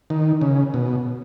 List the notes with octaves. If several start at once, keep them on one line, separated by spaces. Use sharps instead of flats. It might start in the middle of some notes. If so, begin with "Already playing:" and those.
D#3
C#3
B2